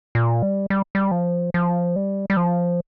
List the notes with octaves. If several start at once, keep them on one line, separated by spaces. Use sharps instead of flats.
A#2
G3
G3
G3
F3
F3
G3
G3
F3